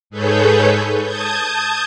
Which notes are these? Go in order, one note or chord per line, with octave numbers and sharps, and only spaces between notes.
G#2 G#4 A4 B4 C#5 G6
A5 D#6 G6 G#6